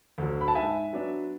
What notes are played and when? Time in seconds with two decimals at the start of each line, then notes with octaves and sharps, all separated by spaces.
0.18 D2 D3 F#3
0.41 B5
0.48 A5
0.55 G#2 E5 G#5
0.93 F#3 B3 D4